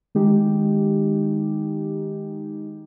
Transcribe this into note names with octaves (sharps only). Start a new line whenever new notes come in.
D#3 G#3 D#4 G4